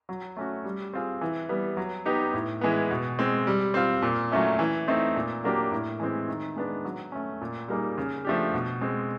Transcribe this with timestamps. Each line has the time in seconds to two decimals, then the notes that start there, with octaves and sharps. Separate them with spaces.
0.09 F#3
0.37 A3 C#4 F#4
0.64 G3
0.93 C4 F4 G#4
1.21 E3
1.49 G3 B3
1.77 F#3
2.06 B3 D#4 G4
2.33 A2
2.61 E3 G#3 B3
2.91 B2
3.19 G#3 C4
3.47 G3
3.74 C4 F4
4.02 A#2
4.31 F#3 A3 C#4 E4
4.59 E3
4.88 A3 C4 D#4
5.16 A#2
5.44 F#3 A#3 D4 G4
5.71 A2
6.00 E3 G#3 C4
6.28 D#3
6.56 G#3 B3 D4
6.85 F#3
7.12 A3 C#4
7.41 A#2
7.68 G3 A#3 D#4 G#4
7.98 C#3
8.25 F3 A3 D4 G4
8.54 B2
8.81 G#3 C4